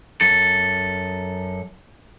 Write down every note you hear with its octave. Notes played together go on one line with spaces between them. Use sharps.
F#2 A4